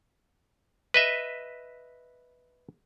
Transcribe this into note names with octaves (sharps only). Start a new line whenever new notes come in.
B4 D#5 E5